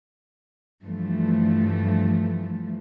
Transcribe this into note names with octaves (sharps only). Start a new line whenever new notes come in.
G2 E3 F3 A3